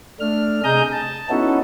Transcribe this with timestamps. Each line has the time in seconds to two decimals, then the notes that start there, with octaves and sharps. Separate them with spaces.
0.20 A3 D4 F6
0.64 C3 G#4 D#5 A#5 D#6 G6
0.93 A5
1.30 B3 C#4 D#4 E4 F#4 A4